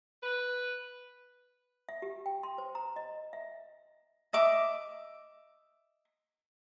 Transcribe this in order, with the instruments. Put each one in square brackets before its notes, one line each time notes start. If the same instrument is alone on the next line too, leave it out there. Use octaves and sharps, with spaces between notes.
[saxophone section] B4
[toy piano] E5
G4
G5
C6
C5
A#5
D#5
E5
[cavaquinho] D#5 E5 D6